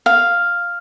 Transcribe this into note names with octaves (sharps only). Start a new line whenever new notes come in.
F5